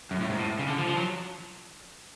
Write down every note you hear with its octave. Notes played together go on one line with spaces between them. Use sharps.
F#2
A2
G#2
A2
C#3
D3
F3
F3
F#3